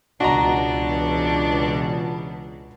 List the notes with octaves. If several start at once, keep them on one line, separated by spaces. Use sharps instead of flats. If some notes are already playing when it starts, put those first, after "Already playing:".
C#2 B2 E3 D4 F#4 D#5 A#5